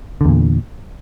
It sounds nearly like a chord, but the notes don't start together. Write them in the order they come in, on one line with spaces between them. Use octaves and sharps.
D3 E2 A#2